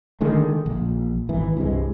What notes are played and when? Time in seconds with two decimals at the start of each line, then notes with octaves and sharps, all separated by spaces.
0.21 D3 D#3 G#3 A3
0.66 A#1
1.29 G#1 E3
1.57 C2 G2 C3 G#3